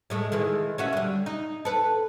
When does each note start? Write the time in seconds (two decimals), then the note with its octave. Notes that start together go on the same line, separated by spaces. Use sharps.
0.10 A2 G#3 A3
0.32 D#3 E3 G#3
0.78 C#4 F#4 E5
0.93 D3 G3
1.26 D#4
1.65 A4 B4